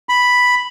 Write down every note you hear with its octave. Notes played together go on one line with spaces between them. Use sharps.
B5